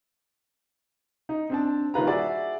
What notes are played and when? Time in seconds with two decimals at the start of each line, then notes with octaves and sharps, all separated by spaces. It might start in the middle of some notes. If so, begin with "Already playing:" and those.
1.29 D#4
1.50 C4 D4 A5
1.94 D#1 D#3 F4 B4 A#5
2.07 E4 F#4 G#4 D5 E5